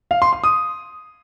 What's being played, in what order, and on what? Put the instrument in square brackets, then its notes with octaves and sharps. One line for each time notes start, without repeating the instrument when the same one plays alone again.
[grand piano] F5
C6
C6
D#6